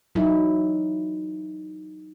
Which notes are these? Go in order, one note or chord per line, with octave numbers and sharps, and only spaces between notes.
F#3 D#4 E4